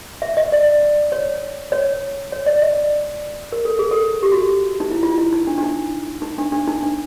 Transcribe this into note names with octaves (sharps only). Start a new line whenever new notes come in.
E5
D#5
D5
C#5
C#5
C#5
D5
D#5
A#4
A4
G#4
A4
G4
F#4
D#4
E4
F4
E4
D#4
D4
D4
D#4
D#4
D4
D4
D#4
D4